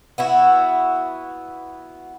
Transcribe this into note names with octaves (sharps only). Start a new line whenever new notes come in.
B3 E4 F#4